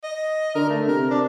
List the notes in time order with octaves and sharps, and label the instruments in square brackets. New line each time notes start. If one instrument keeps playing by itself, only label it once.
[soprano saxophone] D#5
[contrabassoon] D3 [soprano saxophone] A#4
[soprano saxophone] A3
[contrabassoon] C3 [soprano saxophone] A#4
[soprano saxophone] D4